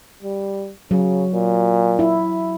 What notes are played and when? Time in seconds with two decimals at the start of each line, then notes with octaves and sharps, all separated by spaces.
0.23 G3
0.91 C#3 F#3
1.33 A#2
1.99 E4